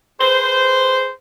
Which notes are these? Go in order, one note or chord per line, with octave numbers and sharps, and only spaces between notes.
G#4 B4 C5